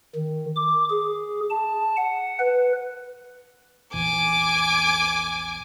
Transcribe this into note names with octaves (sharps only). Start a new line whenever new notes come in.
D#3
D6
G#4
A5
F#5
B4
A#1 E2 G#5 D6